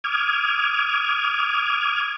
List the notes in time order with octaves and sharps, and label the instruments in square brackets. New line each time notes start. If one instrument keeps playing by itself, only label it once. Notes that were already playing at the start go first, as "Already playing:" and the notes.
[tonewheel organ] D6 D#6 F6 G#6